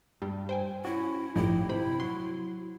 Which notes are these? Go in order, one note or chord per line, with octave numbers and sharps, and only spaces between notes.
G2 G3
C5 G5 G#5
C#4 E4 F#4
A1 G2 F3 D#4 E4 G4
C3 C5 B5
F#3 C6